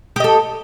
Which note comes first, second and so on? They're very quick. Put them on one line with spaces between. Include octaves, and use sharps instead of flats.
G4 D#5 A4